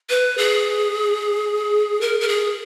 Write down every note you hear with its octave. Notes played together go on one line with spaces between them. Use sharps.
B4
G#4
A#4
A#4
G#4